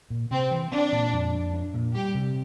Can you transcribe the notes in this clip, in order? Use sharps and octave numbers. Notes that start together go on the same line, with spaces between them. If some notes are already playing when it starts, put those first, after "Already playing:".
A#2
C3 C4
E3
C4 D4
A#2
F2
F2
D4
A#2
G3 G4
C3